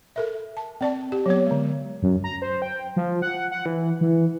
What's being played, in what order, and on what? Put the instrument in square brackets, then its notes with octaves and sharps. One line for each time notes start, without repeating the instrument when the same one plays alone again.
[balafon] A4 A#4 E5
A5
C4 D5 A5
G4
F#3 B3 C#5
D3 G#3
[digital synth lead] F#2
A#5
C5
G5
F3
F#5
F#5
E3
E3